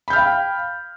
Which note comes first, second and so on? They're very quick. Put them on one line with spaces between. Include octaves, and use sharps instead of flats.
B5 G6 F6 F5 G5